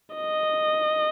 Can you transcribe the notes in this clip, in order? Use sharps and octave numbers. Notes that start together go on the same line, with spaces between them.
D#5